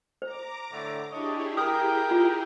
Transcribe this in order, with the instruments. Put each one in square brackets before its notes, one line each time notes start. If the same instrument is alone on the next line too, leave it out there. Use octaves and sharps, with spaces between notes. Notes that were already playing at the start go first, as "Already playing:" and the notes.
[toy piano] C5 [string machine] A#5 D6
[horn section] A2 D3
[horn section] D4 C#5 D#5 [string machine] E4 G4 G#4
[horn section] A#4 G5 [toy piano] D#6
[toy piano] F4